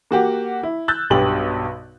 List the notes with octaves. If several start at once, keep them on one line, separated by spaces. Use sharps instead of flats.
A#3 F#4 G4 F#5
E4
E6 F#6 G6 A6
B1 G2 B2 G3 G4 F#7